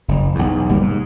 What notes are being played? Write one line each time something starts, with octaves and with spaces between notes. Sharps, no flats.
F#1
B1 E2
G1 C3 G3 A#3
G#2